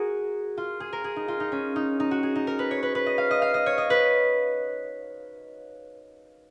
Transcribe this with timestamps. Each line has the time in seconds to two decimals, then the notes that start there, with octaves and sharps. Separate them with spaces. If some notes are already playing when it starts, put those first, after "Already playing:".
Already playing: F#4 G#4 A#4
0.57 F4
0.80 G#4
0.93 A#4
1.04 G#4
1.16 D#4
1.28 F4
1.40 D#4
1.52 C#4
1.76 D#4
2.00 D#4
2.11 F#4
2.23 G#4
2.35 D#4
2.47 A#4
2.59 B4
2.71 C#5
2.83 B4
2.95 B4
3.06 D#5
3.18 F5
3.31 D#5
3.42 F5
3.54 D#5
3.66 C#5
3.78 D#5
3.90 B4